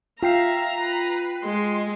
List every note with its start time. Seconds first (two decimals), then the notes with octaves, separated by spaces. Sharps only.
0.23 F4 E5 F5 G5 A#5 C7
0.79 B4
1.44 G#3 C6